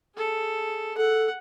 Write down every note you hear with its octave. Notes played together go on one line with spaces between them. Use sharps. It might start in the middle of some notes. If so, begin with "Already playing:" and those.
G#4 A4
A4 F#5